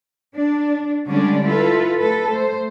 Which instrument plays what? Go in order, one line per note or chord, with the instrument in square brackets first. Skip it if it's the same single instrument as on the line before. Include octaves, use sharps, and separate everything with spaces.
[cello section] D4
D3 G3 G#3 C#4 D4 D5
E4 F4 A4 B4
A3 A4 B4
A3 C5